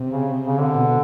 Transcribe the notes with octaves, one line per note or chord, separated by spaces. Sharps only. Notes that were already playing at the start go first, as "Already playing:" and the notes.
Already playing: C3
C#3
C#3
D3
B2